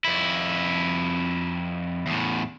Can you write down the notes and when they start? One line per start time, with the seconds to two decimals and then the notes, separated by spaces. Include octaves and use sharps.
0.05 F2 E4
2.06 E2 A2